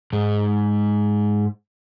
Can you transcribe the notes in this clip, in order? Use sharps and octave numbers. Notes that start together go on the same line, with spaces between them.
G#2 G#3